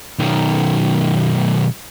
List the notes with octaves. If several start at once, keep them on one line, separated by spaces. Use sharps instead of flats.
B1 D#3